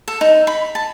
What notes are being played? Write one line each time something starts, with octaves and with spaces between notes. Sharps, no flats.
A4
D#4
B5
A5